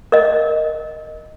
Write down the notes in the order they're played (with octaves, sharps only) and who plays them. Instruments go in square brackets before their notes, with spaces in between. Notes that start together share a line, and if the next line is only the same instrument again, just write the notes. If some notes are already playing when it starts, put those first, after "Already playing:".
[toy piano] A#4 D#5